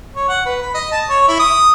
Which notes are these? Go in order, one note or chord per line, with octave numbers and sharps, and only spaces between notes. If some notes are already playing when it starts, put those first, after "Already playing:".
C#5
F#5
B4
B5
D#5
A5
C#5
E4
D#6